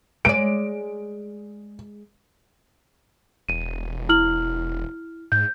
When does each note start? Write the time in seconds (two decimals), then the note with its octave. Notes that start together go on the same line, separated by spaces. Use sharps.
0.25 G#3 D5 D7
3.49 E1 D#7
4.09 E4 F6 F#7
5.32 G#2 G6